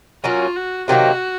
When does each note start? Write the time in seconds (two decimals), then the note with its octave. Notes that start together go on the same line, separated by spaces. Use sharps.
0.24 F#3 A#3 C#4 F4 F#4
0.56 F#4
0.88 C3 D#3 F#3 A#3 F#4